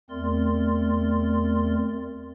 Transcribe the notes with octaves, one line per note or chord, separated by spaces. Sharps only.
E2 A3 C4 A#4 D5 C6